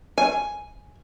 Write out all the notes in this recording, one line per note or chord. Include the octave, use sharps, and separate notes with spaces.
G#5